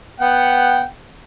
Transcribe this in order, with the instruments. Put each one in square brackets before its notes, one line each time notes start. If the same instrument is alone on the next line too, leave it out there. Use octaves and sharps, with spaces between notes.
[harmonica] B3 F#5 G5